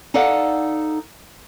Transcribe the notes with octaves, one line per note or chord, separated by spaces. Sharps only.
D#4 A4 D5 F5 F#5